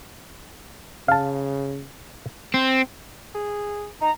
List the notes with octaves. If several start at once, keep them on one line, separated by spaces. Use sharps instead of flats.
C#3 F5 A5
C4
G#4
D#4 A#5